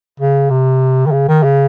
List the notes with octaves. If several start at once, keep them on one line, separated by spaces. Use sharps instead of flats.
C#3
C3
D#3
C#3
D#3
C#3